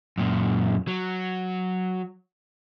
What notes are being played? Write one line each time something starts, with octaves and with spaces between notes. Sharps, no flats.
F#2 A#2
F#3